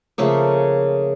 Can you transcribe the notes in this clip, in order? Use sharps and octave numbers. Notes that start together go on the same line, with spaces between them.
C#3 F3 A3 A#3